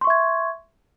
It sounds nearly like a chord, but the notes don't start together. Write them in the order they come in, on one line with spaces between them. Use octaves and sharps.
C6 C#6 E5 G#6